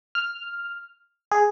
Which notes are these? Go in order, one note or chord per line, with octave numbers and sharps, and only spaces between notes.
F6
G#4